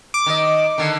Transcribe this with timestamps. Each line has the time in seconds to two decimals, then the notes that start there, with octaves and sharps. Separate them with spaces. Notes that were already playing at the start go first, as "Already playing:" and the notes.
0.14 D6
0.26 D#3 D#5
0.78 D3 D#3